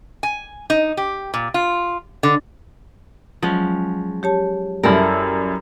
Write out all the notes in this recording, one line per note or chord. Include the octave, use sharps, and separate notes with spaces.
G#5
D#4
G4
A#2
F4
D3
F3 F#3 G#3 C#4
G4 C#5 A5
F#2 G3 E4 A4 A#4